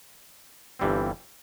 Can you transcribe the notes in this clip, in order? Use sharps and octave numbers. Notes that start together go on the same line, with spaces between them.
G1 G2 E3 G3 C4